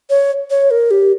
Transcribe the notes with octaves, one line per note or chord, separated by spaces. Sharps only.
C#5
C#5
A#4
G4